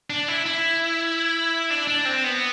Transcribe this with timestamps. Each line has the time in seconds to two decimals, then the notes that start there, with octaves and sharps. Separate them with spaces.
0.10 D4
0.28 E4
0.46 E4
1.70 D4
1.88 D4
2.05 C4
2.24 B3